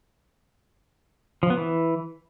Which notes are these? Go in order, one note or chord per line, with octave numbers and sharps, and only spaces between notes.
F3
B3
E3